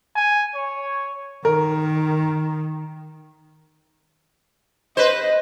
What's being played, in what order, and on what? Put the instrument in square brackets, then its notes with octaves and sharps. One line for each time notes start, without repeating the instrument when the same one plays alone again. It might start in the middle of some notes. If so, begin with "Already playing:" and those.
[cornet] G#5
C#5
[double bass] D#3 [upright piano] A#4
[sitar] B4 C5 [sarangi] D#5